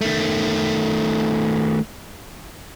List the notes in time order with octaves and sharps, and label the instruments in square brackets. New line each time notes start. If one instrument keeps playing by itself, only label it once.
[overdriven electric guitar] D#3 A3